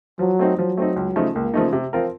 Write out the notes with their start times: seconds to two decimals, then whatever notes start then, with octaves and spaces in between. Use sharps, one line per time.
0.19 F3 F#3
0.39 A3 C4 D#4
0.58 F3 F#3
0.78 A3 C4 D#4
0.96 C#2
1.16 C#3 F3 A3 D#4
1.34 C#2 A#3
1.54 C#3 F3 A3 D#4
1.73 C3
1.93 F3 C4 F4 A#4